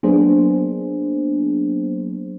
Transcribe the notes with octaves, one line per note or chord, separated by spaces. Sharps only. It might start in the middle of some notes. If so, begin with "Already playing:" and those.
F#3 A#3 B3 D4 G#4 C5